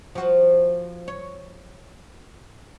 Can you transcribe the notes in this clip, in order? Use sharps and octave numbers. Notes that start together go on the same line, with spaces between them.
F3 F#4
C#5